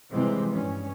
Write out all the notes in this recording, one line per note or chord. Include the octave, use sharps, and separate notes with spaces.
C3 E3 F3 G3 G#3 C4
G2 C#4